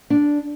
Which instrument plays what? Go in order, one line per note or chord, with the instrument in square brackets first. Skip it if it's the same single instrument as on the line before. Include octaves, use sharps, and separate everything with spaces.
[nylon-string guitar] D4